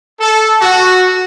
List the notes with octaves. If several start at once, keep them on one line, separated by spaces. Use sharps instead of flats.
A4
F#4